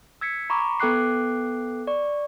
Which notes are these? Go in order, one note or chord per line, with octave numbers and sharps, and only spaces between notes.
E6 G#6 B6 C#7
A#5 B5 C#6 D6
B3 A4 G5 D6 F#6 C7
D5 C#6